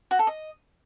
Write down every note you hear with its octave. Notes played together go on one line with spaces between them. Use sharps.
F#4
A4
D#5